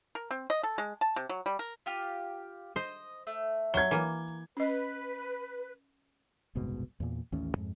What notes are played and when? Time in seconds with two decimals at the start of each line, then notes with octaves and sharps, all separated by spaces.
0.15 A#4
0.31 C4
0.50 D#5
0.63 A4
0.78 G#3
1.01 A5
1.16 C3
1.29 F#3
1.46 G3
1.59 A#4
1.86 F4 G4 F6
2.76 C5 D#5
3.27 A3
3.74 F#3 G#6 G7
3.91 E3 A#3
4.57 C#4 B4 D#5
6.55 F#1 C2 G#2 B2
7.00 E2 A#2
7.32 A1 D#2 C#4
7.56 F2 G#2